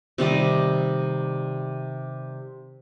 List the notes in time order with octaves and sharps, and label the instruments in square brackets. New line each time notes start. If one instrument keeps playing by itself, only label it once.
[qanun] C3 D#3 G3 D#5